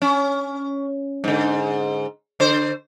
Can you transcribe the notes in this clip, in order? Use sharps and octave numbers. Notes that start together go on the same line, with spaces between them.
C#4
G#2 D3
D3 C5